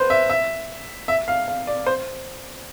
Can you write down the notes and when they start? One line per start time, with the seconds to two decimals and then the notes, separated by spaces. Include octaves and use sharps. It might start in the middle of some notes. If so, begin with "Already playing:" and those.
Already playing: B4 C5
0.10 E5
0.29 E5
1.08 E5
1.28 F5
1.48 F5
1.67 D5
1.86 C5